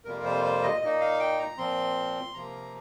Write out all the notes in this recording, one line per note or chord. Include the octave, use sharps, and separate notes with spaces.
F2 C3 G3 A#3 F4 A#4
C5
C5
D#5
A#2 A#3 D#4 D#5
F5
G5
A#5
A#2 F3 C4 C6
C3 F3 A#3 A#5